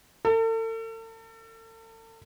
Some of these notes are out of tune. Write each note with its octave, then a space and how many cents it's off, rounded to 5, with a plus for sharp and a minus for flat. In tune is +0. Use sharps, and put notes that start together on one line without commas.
A4 +40